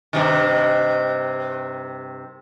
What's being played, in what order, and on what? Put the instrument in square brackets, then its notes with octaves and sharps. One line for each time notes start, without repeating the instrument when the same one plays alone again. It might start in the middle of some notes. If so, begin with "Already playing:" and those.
[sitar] G2 C3 D#3